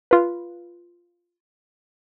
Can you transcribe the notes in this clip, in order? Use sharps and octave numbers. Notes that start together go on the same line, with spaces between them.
F4 B4